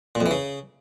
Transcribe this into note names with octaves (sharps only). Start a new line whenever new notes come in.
A#2
F2
E3
C#3